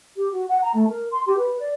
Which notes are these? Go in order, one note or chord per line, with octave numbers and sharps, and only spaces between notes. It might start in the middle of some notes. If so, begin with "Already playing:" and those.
G4
F#4
F#5
A#5
A3
A#4
C6
G4
B4
D5